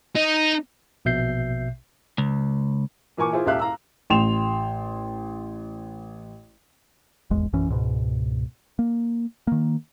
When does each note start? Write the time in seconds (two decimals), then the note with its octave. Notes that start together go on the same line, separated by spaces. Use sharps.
0.16 D#4
1.05 A#1 B2 E5 G6 C7
2.18 C#2
3.17 A#2 E3 A#4 G#5 C#6 D6
3.33 E4 F4 G#4 C5
3.46 D#1 C#2 G4 E5 F5 F#6
3.59 F5 A#5 E6
4.10 A1 G5 C6 E7 F7
7.30 D#1 G#1 E2 G#3
7.53 A#1 F#2 E3 C#4
7.69 C#2 G#2 B2
8.79 A#3
9.47 D#3 A#3